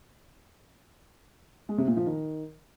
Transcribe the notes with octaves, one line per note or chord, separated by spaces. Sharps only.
G#3
C3
A#2
F3
D#3